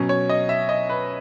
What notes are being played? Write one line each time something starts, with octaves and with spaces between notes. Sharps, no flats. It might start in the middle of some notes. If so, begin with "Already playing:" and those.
Already playing: B2 F#3 C#4
C#5
D#5
E5
D#5
B4